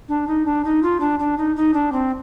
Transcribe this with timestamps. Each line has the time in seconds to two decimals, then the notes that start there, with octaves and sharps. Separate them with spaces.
0.09 D4
0.27 D#4
0.46 D4
0.65 D#4
0.83 F4
1.00 D4
1.19 D4
1.38 D#4
1.56 D#4
1.74 D4
1.92 C4